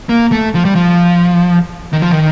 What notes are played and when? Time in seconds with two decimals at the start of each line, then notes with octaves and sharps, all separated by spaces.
0.09 A#3
0.32 A3
0.55 F3
0.65 G3
0.75 F3
1.93 D#3
2.02 F3
2.11 D#3